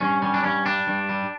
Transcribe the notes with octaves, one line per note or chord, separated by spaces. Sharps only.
G2 C#4
G3 C#4
D4
G2 C#4
G3 D4
G2
G3